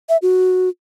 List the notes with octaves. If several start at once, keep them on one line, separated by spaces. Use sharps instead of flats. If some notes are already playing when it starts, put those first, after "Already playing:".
E5
F#4